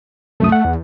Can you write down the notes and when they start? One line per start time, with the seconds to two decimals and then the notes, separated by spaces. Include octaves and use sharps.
0.40 C2 F#2 A3 D#6
0.52 F#5
0.65 E2